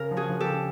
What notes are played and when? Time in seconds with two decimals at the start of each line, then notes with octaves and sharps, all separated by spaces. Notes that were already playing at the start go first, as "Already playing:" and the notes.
Already playing: C#3 A#4
0.11 F3
0.17 F#4 G#4
0.29 F3
0.40 G4 A4
0.46 C#3